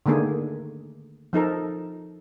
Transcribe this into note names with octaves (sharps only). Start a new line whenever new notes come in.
D3 D#3 A3 A#3 G#4
F3 D#4 A4 A#4